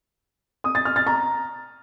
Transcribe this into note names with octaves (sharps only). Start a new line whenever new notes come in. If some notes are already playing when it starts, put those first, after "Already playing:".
D#6
A6
F6
A6
A#5